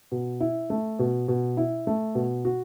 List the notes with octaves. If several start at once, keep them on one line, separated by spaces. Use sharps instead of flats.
B2
E4
A3
B2
B2
E4
A3
B2
F#4